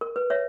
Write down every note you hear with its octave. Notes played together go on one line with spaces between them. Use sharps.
A#4
B4
C#5 E5